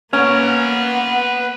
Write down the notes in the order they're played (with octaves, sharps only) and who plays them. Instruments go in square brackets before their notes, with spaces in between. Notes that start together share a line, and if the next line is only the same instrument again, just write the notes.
[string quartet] A#3 [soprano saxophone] B3 [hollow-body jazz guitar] C#4 [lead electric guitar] B4 A#5